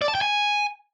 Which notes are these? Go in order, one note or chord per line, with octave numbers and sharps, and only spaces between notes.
D5
A5
G5
G#5